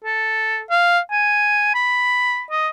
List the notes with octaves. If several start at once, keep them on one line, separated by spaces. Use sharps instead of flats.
A4
F5
G#5
B5
D#5